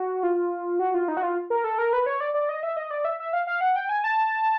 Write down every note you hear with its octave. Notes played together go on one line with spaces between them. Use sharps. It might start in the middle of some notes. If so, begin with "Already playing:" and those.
Already playing: F#4
F4
F#4
F4
D#4
F#4
F4
A#4
A4
A#4
B4
C#5
D5
D5
D#5
E5
D#5
D5
E5
E5
F5
F5
F#5
G5
G#5
A5